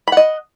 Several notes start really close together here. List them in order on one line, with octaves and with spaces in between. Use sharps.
B5 F#5 D#5